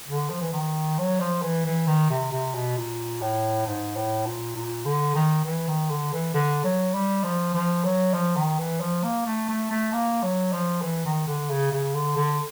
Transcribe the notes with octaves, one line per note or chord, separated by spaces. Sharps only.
D3
F3
E3
D#3
F#3
F3
E3
E3
D#3
C3
C3
B2
A#2
A2
G#2
A2
A#2
A#2
D3
D#3
E3
D#3
D3
E3
D3
F#3
G3
F3
F3
F#3
F3
D#3
E3
F3
A#3
A3
A3
A3
A#3
F#3
F3
E3
D#3
D3
C#3
C#3
D3
D3